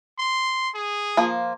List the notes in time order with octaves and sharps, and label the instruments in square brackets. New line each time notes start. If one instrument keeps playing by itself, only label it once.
[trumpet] C6
G#4
[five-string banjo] F3 A#3